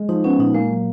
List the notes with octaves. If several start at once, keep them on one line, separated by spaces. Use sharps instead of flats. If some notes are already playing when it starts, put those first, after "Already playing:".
Already playing: G#3
F3 D#4
B3 C#4
A#2 D#4
G#3 A#3
F#3